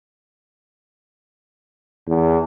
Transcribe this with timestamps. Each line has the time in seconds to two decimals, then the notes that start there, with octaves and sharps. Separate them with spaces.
2.07 E2